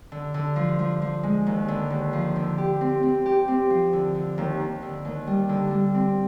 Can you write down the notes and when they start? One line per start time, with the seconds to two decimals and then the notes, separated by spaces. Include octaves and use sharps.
0.12 D3
0.34 D3
0.56 F3
0.79 F3
1.02 F3
1.23 G#3
1.47 D#2
1.68 D3
1.90 D#2
2.13 F3
2.36 D3
2.58 G4
2.81 C4
3.03 C4
3.26 G4
3.48 C4
3.70 F3
3.93 D3
4.15 D3
4.38 D#2
4.60 D#2
4.82 D3
5.05 D#2
5.27 G3
5.49 D3
5.71 G3
5.94 C4